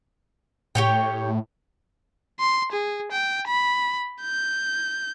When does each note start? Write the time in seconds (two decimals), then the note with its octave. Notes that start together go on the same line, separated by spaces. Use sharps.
0.75 A2 G4 C#5 G5
2.40 C6
2.72 G#4
3.12 G5
3.47 B5
4.21 G6